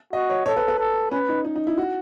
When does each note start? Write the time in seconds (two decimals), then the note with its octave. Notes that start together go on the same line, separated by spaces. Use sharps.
0.13 F#4 D#5
0.30 C#5
0.46 A4 C#5
0.57 B4
0.68 B4
0.78 A4
1.11 C#4 B4
1.28 D#4
1.45 D#4
1.56 D#4
1.67 E4
1.77 F#4